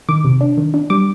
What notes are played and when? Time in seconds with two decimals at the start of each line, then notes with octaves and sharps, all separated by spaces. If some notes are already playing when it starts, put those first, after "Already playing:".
0.09 D#3 D6
0.25 C3
0.41 D4
0.58 D#3
0.74 D4
0.90 G3 D6